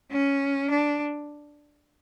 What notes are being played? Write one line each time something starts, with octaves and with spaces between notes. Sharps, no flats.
C#4
D4